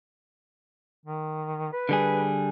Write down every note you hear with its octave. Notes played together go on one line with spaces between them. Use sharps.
D#3
B4
D3 G3 G#4